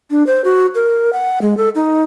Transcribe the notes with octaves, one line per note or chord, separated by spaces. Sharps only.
D4
C5
F#4
A#4
F#5
G#3
A4
D#4